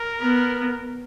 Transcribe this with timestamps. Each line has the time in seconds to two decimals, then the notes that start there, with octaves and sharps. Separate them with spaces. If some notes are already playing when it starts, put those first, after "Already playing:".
Already playing: A#4
0.21 B3